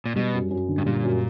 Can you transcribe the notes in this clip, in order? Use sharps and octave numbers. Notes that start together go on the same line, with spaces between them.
A#2
B2 G3
F#2
F#2
D3
G2
A#2 G3
F#2